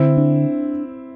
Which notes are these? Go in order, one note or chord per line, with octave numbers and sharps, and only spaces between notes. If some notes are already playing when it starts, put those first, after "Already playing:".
Already playing: D3 C4 E4
D4